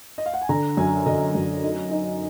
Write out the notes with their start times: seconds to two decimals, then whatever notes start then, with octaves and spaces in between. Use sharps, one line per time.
0.18 D#5
0.26 F5
0.33 F#5
0.41 G#5
0.49 D3 A#5
0.77 F#2 G#5
1.06 D3 D#5
1.35 F#2
1.64 D#4
1.91 D#4